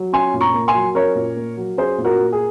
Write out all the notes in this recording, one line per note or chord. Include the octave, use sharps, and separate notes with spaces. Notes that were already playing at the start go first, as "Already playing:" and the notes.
Already playing: F#3
C#4 G#5 C6
A#2
A#5 C#6
A#3
G#5 C6
F#3
C#4 A#4 C#5
A#2
A#3
F#3
C#4 G#4 C5
A#2
F#4 A#4
A#3
G#4